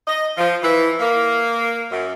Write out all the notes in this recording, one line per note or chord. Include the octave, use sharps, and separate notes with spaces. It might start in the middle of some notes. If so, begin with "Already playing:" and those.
D#5
F3
E3
A#3
F#2